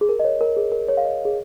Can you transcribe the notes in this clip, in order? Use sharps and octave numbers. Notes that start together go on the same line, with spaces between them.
G#4
A#4
D#5
C#5
A#4
G#4
A#4
C#5
F5
D#5
G#4